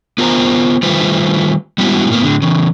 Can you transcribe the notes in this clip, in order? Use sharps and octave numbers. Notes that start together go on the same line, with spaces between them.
B3 F4 A#4 C5 G#5 A#5
D#3 G3 A3 F4 B4 C5
G3 G#3 B3 E4 F#4
A2 A#3 B3
A2 D3
C#3 E3